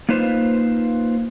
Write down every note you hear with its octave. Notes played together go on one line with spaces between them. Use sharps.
A#3 D#4 F4 B4 C5